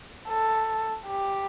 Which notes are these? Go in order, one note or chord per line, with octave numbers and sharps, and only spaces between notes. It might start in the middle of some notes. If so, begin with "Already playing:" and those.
A4
G4